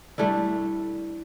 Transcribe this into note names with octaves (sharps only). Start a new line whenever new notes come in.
G3 A3 D4 E4